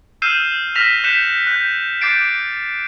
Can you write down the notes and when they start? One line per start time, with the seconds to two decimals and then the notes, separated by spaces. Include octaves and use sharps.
0.22 E6 F6 G6 C7 D#7 E7
0.75 F6 A#6 B6 E7 F7
1.04 F#6 G6 B6 C#7 E7
1.47 F#6 G6
2.01 D6 G6 A6 C7 D7